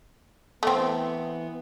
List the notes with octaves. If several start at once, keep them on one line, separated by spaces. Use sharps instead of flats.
E3 A3 B3 C4